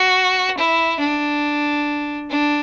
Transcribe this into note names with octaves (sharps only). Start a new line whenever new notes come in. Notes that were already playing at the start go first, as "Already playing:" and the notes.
Already playing: F#4
E4
D4
D4